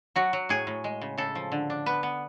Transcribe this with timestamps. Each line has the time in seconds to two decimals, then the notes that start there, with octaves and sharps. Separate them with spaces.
0.16 F#3 F#4
0.33 F#3
0.49 A2 G#4
0.67 A2
0.84 G#3
1.01 C#3
1.18 C#3 A4
1.35 F3
1.52 D3
1.70 D4
1.86 B3 B4
2.03 B3